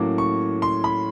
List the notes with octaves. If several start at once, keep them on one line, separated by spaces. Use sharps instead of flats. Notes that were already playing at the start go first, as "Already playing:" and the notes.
Already playing: A2 F#3 A#3 C#4 D6
C#6
C6
B5